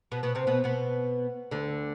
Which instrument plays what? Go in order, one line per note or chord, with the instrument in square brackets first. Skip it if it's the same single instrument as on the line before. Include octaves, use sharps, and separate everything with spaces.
[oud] B2 B3
B2 B3
C3 C4
B2 B3
B2 B3
D2 D3